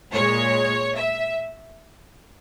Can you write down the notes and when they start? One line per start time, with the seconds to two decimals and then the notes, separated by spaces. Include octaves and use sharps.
0.13 A#2 G#3 C#5
0.97 E5